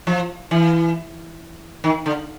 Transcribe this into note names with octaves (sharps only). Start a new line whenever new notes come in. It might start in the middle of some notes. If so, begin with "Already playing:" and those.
F3
E3
D#3
D3